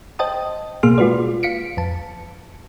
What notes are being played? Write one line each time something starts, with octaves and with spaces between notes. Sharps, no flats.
C5 D#5 G5 A5 D#6
B2 A#3 G#4 C6 F6
G#3 F4 F#4 B4 D5
F5 B6 C#7 D7
F2 A5